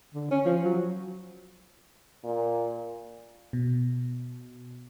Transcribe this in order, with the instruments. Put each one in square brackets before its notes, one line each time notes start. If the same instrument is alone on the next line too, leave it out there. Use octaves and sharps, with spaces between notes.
[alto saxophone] D3
C#4
F3
F#3
[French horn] A#2
[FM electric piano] B2